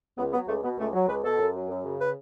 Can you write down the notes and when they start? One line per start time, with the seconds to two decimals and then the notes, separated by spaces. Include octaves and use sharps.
0.18 C#2 B3
0.33 F#3 B3
0.48 C#2 A3
0.63 B2 B3
0.78 C#2 A3
0.93 F#3
1.08 C#2 B4
1.24 B2 A4
1.39 F#2
1.54 F#3
1.69 F#2
1.84 C#3
2.00 B4